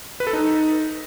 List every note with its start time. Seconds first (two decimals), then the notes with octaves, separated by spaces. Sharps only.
0.20 B4
0.27 A4
0.33 D#4